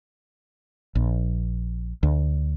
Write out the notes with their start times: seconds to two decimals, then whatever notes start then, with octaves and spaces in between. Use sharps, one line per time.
0.95 A#1
2.03 D2